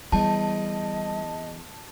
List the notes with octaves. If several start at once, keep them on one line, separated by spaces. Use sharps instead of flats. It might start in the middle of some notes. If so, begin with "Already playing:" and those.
E2 G3 D#5 A5